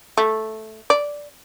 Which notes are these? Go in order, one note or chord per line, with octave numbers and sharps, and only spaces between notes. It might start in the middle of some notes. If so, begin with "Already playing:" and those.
A3
D5